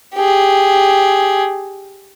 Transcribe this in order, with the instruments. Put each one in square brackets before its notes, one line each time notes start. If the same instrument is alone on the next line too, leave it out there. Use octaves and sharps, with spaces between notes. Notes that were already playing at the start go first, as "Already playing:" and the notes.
[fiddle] G4 G#4